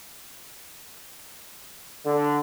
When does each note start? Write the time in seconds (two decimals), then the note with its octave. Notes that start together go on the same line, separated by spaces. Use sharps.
2.05 D3